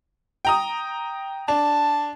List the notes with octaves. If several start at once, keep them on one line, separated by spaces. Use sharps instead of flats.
G5 A#5 D#6
D4 A5